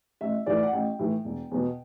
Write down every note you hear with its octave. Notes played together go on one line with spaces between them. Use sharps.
A1 E5
A2 E3 D5
F#5
A1 G5
A2 E3
E1
E2 B2